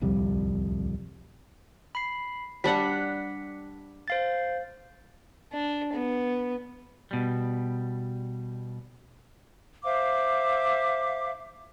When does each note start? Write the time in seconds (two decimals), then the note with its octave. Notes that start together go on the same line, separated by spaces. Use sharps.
0.01 D1 C2 F2 G3
1.95 B5 C7
2.64 G3 D4 F#5 B6 C#7
4.08 C5 F5 A6
5.53 D4
5.93 B3
7.11 B2 G3
9.84 C5 E5 F5 D6